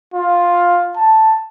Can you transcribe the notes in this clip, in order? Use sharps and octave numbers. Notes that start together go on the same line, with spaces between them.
F4
A5